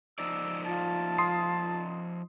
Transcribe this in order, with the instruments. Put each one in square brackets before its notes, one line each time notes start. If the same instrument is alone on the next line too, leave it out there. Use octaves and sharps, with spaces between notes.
[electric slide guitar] F3 D#4 D5 [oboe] E6
[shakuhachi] F4 [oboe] A5
[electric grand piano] C6 D#6 C7